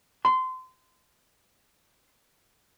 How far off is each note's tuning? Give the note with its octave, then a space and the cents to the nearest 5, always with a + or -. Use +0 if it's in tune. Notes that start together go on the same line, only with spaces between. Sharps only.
C6 -25